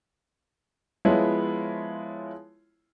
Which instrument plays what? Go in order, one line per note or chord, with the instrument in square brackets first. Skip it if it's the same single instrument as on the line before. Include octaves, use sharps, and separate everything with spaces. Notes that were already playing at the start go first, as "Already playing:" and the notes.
[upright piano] F3 G#3 B3 E4 F4 C#5